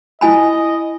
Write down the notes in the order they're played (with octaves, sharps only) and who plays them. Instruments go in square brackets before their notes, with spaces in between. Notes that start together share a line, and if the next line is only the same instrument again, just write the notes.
[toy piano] E4 G#5 B5 [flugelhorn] D#5